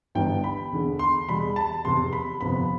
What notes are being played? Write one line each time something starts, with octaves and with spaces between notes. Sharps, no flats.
G1 G2 E3 G3 B3 G5
B5
E1 E2 D3
C6
E2 B2 G3 B5
A5
F1 E2 C3 C6
B5
G1 F2 C3 F3 B3 B5